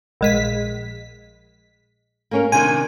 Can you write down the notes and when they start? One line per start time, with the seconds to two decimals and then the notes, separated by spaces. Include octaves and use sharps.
0.21 A#1 G#3 B6
2.31 A#3 C#4 A#4
2.52 C3 D#3 D4 G#5